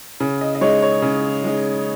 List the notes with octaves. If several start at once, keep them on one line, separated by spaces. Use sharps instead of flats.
C#3
D#5
D#5
G#3 D#4 C#5
C#5
C#3
G#3 D#4